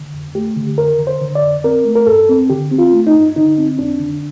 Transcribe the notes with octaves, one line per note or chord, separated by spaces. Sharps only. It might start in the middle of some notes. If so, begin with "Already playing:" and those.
Already playing: D3
F2
A3 G4
D3
F2 A#4
D3
C5
D3
D5
F2
C4 A#4
A3
A#4
G2 A4
C4
D3 G4
C4
F4
A3
D#4
G2
D3 D#4
C4
F2 D4
D3